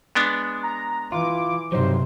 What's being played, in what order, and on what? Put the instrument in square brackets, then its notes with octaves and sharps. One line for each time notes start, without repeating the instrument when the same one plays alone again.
[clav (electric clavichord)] G#3 B3 D4
[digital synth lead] A#5
[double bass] E3 [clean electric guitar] F4 [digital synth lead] D6
[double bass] G2 C3 [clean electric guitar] F#3 G3 D#4 [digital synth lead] C5